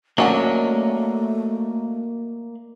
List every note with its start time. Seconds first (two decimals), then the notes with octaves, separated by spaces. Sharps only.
0.18 F#3 A3 A#3 C#4 D4 D#5